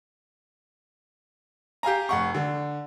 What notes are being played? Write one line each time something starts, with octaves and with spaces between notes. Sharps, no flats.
G4 F5 G#5 A#5
F1 F#5 C#6
D3